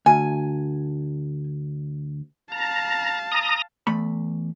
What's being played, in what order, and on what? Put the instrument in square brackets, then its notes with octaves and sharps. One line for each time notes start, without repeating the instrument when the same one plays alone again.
[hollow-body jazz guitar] D2 [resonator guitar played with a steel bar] G#5
[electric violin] F5 A5 [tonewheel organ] A#5
[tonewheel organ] A#5 D#6
[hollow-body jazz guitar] E2 A3 B5